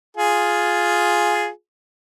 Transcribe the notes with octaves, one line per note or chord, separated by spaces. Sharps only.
F4 G#4